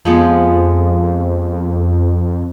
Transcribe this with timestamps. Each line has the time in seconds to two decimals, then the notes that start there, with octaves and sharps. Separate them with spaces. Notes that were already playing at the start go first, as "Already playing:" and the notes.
0.05 F2 F3 G#3 B3